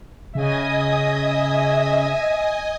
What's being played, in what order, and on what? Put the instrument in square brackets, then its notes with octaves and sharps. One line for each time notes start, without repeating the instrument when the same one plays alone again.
[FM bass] C#3 [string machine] D#5 G#5 D#6 [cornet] E5